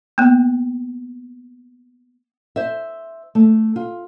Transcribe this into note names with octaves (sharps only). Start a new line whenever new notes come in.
A#3 B3
C5 E5
A3
F4